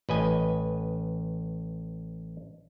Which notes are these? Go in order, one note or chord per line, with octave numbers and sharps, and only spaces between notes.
A1 B4 D#5 G#5